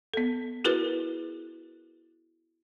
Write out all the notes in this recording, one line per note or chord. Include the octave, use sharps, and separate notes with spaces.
B3 A4
E4 F#4 G#4 A#4 B4